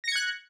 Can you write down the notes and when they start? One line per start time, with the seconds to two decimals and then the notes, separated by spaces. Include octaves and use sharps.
0.04 A#6
0.08 C#7
0.12 G#6
0.16 F#6